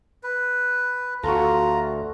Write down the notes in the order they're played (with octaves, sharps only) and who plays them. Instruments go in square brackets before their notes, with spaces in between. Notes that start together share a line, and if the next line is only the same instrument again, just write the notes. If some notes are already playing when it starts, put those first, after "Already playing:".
[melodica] B4
[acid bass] D2 [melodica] F4 A#5 [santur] F#4 A4